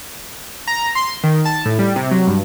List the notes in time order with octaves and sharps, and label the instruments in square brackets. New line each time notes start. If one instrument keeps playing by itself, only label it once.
[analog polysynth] A#5
C6
D#3
A5
A2
G3
C3
F#3
G2